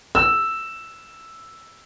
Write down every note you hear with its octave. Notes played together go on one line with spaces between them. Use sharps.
E6